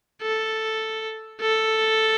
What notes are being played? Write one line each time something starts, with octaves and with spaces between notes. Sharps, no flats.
A4
A4